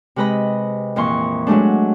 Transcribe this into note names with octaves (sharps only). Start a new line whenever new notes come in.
C3 G#3 B4 D#5 B5
F2 A#2 E3 C6 C#6
F#3 G#3 A3 D4